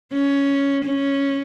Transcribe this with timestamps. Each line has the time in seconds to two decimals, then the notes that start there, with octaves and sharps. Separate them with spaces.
0.13 C#4
0.85 C#4